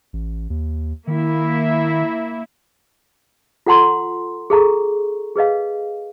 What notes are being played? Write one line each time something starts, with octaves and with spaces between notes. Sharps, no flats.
A1
D#2
D#3 A#3 E4
F4 A4 F#5 A#5 C6
G#4 A4 A#5 C#6
G#4 B4 D#5 F5